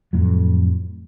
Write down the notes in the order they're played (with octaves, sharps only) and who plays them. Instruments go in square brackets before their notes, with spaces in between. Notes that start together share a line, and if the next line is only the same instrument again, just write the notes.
[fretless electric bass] F2 A2 F#3